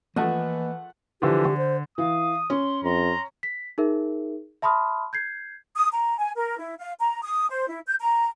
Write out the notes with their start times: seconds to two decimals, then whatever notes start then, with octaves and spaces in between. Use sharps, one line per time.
0.16 E3 F3 A3 A#3 D#5 F#5 A5
1.22 D3 E3 F3 G4
1.45 D3
1.57 C5
1.98 E3 F5 D#6
2.50 C#4 C6
2.84 F2 A#5 C6
3.43 B6
3.78 D#4 G#4 A#4 E5
4.62 E5 A5 B5 C6 D#6 F6
5.13 G6 G#6 C7
5.75 D#6
5.91 A#5
6.17 G#5
6.35 A#4
6.58 E4
6.79 F5
6.99 A#5
7.23 D#6
7.48 C5
7.69 E4
7.86 G6
8.00 A#5